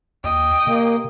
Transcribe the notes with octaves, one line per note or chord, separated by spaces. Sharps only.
D#2 D#5 G5
C3 A#3